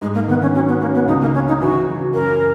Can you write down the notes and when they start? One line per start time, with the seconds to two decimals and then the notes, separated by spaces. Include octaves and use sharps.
0.02 G#2 G#3
0.14 A#3
0.28 D#3 B3
0.42 C#4
0.55 F#3 C#4
0.68 B3
0.81 A#3 C#4
0.94 B3
1.07 C#2 D#4
1.21 A#3
1.34 C#3 C#4
1.48 D#4
1.61 E3 F#4
1.88 C#2
2.14 F#2 A#4